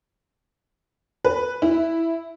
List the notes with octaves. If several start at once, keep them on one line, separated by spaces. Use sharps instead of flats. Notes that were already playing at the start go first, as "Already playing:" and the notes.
B4
E4